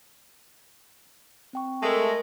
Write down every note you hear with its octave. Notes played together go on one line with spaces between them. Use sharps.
C4 G5 C#6
G#3 A3 A#4 A5
A#6